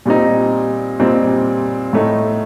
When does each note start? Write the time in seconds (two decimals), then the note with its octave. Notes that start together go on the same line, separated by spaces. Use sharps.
0.06 A#2 G3 C4 D#4
0.99 A#2 G3 C4 D#4
1.93 A2 A3 D#4